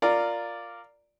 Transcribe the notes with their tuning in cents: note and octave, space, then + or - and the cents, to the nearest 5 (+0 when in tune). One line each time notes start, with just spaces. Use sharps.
F4 +0 A#4 -10 D5 +0